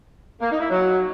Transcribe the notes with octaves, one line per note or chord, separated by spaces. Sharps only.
A#3
D#4
E4
F#3